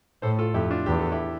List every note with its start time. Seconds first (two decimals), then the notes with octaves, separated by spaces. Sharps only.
0.22 A2 A4 C5
0.39 F4 A4
0.54 F2 E4 G4
0.71 D4 F4
0.86 E2 G4
0.99 A4
1.12 E4 G4